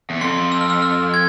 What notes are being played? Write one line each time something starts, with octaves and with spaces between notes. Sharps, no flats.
E2
F2 C6
E6
F6
E6
F6
G#6